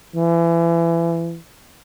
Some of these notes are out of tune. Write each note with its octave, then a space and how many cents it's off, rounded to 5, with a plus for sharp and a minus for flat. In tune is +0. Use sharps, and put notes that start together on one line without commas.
E3 +30